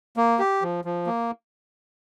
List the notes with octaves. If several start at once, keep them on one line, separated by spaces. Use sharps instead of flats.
A#3
G4
F3
F3
A#3